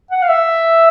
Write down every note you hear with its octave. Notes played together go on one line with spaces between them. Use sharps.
F#5
F5
E5